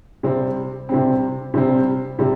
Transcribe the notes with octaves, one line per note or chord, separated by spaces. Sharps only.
C3 G3 C4
C3 G3 C4
C3 G3 C4
C3 G3